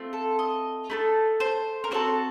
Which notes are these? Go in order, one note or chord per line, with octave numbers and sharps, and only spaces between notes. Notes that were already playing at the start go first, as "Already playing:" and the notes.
Already playing: A3 C4 F4
A4
D#5
A3 D#4 A4
C5
A#4
C4 F#4 A4 C5